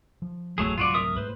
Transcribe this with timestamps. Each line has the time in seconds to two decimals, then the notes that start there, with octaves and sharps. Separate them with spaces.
0.22 F3
0.58 F#1 E2 G#2 F#3 A3 G#4
0.78 C2 G#2 F#3 F4 F#4 D5
0.94 A#4 E5 D#6
1.17 G#2 A3 A#3 B4 C5